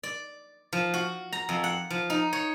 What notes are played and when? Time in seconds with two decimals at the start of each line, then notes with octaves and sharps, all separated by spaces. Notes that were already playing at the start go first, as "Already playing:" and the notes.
0.03 D5
0.73 F3
0.94 F#4
1.32 A#5
1.49 F2
1.64 F#5
1.90 F3
2.10 D#4
2.33 C#5